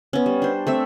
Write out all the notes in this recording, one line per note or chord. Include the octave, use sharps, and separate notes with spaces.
B3 C#4
G3
D4 C5
A3 C4 E5